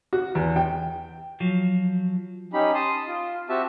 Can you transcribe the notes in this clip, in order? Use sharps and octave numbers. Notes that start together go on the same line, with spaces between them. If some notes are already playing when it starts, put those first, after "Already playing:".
F#4
E2
G5
F3 F#3
C#4 D#4 G4 B5
A5 C6 D#6
F4
C4 F#4 G4 E5 A5